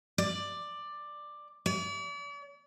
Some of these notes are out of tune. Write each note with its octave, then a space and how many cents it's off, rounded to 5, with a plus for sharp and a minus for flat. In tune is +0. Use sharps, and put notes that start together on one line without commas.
D5 +10
D5 -45